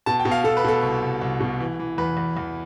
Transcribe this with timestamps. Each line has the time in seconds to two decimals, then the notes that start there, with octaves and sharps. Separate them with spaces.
0.06 B2 A5
0.20 G5
0.25 B2
0.31 F5
0.44 B2 A4
0.57 B4
0.65 B2 A4
0.83 C2
1.02 C2
1.21 C2
1.41 B2
1.60 E3
1.80 E3
1.98 E2 B4
2.17 E2
2.37 E2